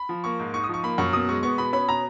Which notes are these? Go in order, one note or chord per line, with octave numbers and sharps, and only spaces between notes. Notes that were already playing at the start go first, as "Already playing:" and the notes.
Already playing: B5
F3
A#3 C#6
G#2
D#4 C#6
D#6
F3 C#6
A#3 B5
F#2 C#6
B2 D#6
G#3 C#6
B3 C#6
B2 B5
C#4 B5
B2 A#5